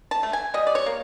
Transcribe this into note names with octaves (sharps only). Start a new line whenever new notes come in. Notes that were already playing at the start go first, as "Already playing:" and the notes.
A5
A3
G#5
G3 D#5
D5
C#5
A#3